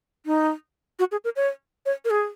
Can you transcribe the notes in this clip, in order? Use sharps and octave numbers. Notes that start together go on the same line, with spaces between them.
D#4
F#4
G#4
A#4
C#5
C#5
A#4
G#4